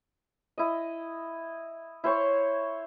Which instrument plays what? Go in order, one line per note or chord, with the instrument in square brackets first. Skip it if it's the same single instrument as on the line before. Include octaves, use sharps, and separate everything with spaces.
[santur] E4 D#5
E4 C5 C#5 C#6